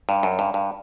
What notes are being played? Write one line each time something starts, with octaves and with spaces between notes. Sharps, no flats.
G2
F#2
G2
G2